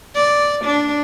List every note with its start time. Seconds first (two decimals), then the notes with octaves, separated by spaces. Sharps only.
0.15 D5
0.65 D4